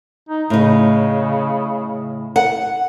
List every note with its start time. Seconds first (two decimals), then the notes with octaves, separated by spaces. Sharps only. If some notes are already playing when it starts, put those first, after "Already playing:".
0.29 D#4
0.50 A2 C#3 D#4
2.36 F#5